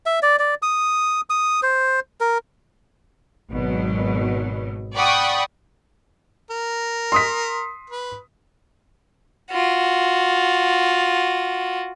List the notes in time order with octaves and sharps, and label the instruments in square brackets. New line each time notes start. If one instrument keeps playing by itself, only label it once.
[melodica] E5
D5
D5
D#6
D#6
C5
A#4
[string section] G#1 B2 F#3
D5 F#5 G5 B5 C#6 D#6
[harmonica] A#4
[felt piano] C6 D#6 B6
[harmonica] B4
[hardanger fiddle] F4 F#4